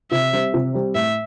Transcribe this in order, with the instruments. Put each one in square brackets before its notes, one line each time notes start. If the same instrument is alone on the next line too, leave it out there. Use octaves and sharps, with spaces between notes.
[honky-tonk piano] C3 [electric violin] E5
[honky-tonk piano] G3 C4
C3
G3 C4
[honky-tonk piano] A2 [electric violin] E5